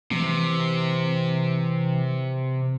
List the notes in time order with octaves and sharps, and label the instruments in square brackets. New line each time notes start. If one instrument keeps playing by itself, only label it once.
[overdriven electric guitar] C3 [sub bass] E3